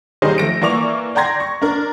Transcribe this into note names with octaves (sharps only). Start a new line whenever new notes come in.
D#3 G3 D#4 G#4 C5
F3 A3 A#6 D7
E3 A#3 D5 C#6 D6 F7
D5 G5 A#5 C6 G#6 A#6
C#6
D4 A#4